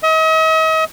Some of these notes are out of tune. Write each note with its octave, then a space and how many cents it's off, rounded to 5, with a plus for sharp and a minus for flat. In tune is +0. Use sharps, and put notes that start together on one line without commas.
D#5 +40